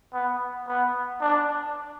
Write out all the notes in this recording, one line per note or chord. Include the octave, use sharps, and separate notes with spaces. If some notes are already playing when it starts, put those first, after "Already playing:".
B3
B3
D4